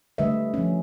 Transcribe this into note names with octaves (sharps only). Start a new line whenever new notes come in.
D3 G3 A3 B4 D#5 E5
F3 C#4